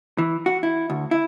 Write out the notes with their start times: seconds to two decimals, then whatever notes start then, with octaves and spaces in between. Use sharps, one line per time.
0.18 E3
0.46 F#4
0.63 E4
0.90 D2
1.11 E4